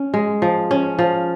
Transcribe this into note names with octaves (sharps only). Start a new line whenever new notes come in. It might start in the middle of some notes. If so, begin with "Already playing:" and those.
Already playing: C#4
G#3
F3
C#4
F3